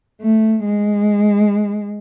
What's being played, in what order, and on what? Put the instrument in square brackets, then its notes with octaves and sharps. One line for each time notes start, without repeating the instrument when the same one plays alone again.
[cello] A3
G#3